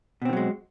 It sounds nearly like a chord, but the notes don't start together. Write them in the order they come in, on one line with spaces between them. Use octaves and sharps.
B2 C4 D#3 F#3 G#3